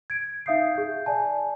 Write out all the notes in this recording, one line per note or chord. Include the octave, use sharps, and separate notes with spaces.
G#6 D7
D#4 E5 F5 D#6 G6 C7
G#4 G6
D5 G#5 A5